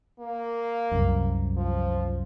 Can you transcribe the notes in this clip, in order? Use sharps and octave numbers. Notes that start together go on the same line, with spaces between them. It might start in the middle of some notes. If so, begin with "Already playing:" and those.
A#3
C2 F#2
F3